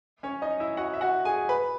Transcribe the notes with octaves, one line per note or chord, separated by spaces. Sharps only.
C#4 C#5
D#4 D#5
E4 E5
F#4 F#5
E5
F#4 F#5
G#4 G#5
B4 B5